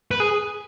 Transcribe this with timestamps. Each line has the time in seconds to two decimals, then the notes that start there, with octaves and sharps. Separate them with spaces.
0.11 B4
0.20 G#4